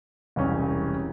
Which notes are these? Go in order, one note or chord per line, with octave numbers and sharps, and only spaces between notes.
E1 C2 C#4